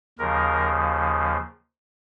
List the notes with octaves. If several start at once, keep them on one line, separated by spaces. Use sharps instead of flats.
D#2 C#3 F3 A#4